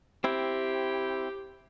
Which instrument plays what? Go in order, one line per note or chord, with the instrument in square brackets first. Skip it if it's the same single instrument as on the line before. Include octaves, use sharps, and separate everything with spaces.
[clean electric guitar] C4 E4 [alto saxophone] G4